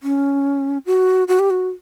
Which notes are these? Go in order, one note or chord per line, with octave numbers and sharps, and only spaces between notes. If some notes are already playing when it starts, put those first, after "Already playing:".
C#4
F#4
F#4
G4
F#4